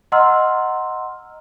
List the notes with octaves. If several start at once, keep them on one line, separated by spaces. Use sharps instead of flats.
D#5 F#5 A#5 C6 E6 F6